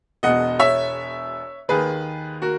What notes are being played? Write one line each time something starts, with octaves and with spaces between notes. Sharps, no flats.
E1 E2 B2 D#5 F#5
C#5 E5
D#2 D#3 G#4 B4
F#4 A#4